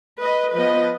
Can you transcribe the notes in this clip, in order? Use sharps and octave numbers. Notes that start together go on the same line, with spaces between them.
B4 D#5
F3 B3 B4 D#5